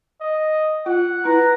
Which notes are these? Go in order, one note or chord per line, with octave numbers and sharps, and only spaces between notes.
D#5
F4 F#5
E4 B4 A#5